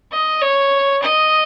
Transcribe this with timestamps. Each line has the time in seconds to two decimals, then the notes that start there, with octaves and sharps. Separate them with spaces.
0.12 D#5
0.42 C#5
1.02 D#5